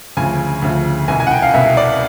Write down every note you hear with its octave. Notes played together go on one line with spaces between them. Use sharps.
D2 C#3 F3 G#5
D2 C#3 F3
C2 B2 G#5
G#5
F#5
G5
F5
C2 B2 E5
D5